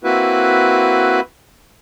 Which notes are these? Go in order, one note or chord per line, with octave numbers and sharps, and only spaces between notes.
A#3 C4 E4 F#4 B4